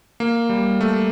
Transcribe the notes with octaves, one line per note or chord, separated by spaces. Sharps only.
A#3
G3
A3